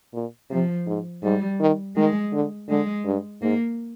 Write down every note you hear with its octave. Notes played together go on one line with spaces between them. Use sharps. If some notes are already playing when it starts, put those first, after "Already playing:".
A#2
C3 F3
G#2
G#2 G3
D#3
D#3 G#3
D3
D3 G#3
G2
G#2 A#3